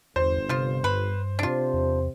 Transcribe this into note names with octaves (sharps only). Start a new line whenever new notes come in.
G1 E2 C5
C3 F3 F4
G2 B4
C3 D4 F4 C5
E2